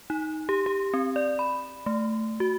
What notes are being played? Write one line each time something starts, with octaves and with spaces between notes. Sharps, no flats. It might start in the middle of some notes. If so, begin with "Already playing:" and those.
D#4
G4
G4
C4
D5
B5
A3
F#4